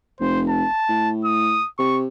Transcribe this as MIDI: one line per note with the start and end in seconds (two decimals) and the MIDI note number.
0.20 0.65 29
0.20 0.42 72
0.49 1.11 81
0.89 1.59 45
1.25 1.68 87
1.79 2.07 48
1.79 2.00 85